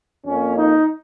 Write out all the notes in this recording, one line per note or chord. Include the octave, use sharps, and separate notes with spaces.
F2 F3 A#3 C#4
D#4